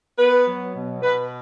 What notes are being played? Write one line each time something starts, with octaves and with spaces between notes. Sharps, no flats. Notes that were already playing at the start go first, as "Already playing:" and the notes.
B3 B4
F#3
B2
B2 B4